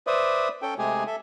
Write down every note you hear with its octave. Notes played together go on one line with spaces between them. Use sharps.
B4 C5 D5 E5 D#6
C#4 A4 G5
C3 G#3 A3 G4 G#4 G#5
A4 E5